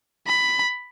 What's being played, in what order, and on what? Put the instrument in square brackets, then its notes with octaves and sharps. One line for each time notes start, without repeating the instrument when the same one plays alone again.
[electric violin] B5